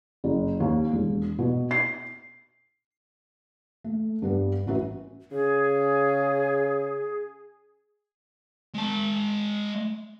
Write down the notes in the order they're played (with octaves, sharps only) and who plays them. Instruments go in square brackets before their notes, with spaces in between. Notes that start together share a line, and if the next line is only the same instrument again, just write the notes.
[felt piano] F#1
D#2
E1
B2
C7
A3
G2 G3 B3
A1 C#4 F#4 B4 E5
[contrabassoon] C#3 [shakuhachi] G#4
[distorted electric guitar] G#3 A5